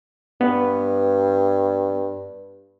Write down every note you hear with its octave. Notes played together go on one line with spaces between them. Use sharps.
G2 B3